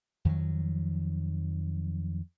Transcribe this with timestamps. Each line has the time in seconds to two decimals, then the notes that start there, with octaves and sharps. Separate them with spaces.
0.25 F2 D#3 F3 F#3